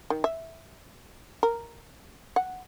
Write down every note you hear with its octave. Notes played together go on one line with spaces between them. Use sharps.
D#3
E5
A#4
F#5